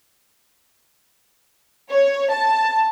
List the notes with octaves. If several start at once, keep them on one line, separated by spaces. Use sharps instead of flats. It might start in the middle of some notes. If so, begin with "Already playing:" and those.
C#5
A5